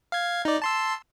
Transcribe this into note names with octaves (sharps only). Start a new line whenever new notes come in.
F5 G#6
D#4 D5
A5 C6 E6